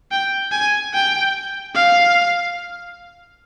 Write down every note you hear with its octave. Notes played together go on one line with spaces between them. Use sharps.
G5
G#5
G5
F5